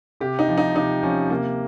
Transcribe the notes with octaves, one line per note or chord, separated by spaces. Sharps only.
C3 G4
D#4
F3
D#4
C3 D#4
F3 C#4
C3 A#3